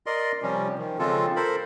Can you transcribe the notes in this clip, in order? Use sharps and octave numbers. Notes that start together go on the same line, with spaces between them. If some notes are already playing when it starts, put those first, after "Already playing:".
A#4 D5 D#5 C6
C3 F3 G3 C#4
D#3 F3
C#3 F3 G#3 C4 F4 A4
A4 A#4 C5 B5